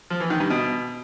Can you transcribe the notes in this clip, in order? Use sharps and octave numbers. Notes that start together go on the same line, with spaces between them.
F3
E3
D#3
G2
B2